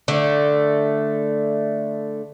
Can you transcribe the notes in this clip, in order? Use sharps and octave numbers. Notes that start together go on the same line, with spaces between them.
D3 A3